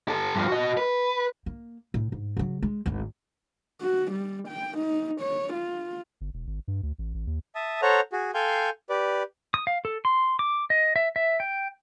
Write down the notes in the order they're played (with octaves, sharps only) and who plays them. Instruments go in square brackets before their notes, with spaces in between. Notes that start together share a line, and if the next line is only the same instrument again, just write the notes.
[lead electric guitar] G4 A4
G2 F3
F#4 D#5
B4
[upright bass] A#3
A2
G#2
C#3 F#3
G#3
G#1 D2
[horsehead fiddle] F#4
G3
G5
D#4
C#5
F4
[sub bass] G1
E1
G#1
G2
D2
A1
A1
D#2
[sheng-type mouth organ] E5 A5 D#6
A4 C5 C#5 F#5 A#5
F#4 G#4
A4 F5 G5 G#5 C6 G6
G4 B4 D5
[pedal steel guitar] D#6
F5
A4
C6
D6
D#5
E5
E5
G5